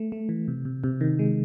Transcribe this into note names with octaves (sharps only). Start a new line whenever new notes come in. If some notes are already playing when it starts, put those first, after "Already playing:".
Already playing: A3
A3
E3
C3
C3
C3
D#3
G#3